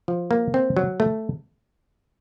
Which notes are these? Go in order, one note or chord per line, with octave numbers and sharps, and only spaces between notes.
F3
A#3
C4
F#3
A3